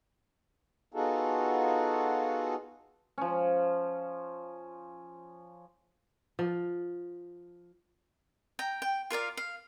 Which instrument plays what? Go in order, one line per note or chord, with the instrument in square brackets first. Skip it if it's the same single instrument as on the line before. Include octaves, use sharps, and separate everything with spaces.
[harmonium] B3 D#4 F4 F#4 G#4 A4
[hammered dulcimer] F3 C#4
[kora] F3
[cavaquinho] G5 A#5
G5
F4 A#4 D5 F5
F5